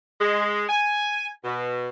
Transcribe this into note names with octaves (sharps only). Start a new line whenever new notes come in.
G#3
G#5
B2